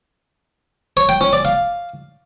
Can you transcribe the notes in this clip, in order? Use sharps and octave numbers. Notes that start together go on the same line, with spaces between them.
C#5
G5
C#4
D5
F5